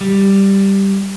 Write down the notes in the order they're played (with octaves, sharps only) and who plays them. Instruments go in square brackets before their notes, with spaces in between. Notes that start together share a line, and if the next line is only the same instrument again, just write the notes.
[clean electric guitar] G3